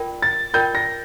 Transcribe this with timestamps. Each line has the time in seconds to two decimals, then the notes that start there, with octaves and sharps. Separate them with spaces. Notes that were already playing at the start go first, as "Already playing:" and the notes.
Already playing: F4 A#4 D5 G5
0.22 A6
0.54 F4 A#4 D5 G5 G6
0.75 A#6